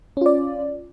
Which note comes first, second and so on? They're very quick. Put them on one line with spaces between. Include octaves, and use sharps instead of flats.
C#4 F4 D5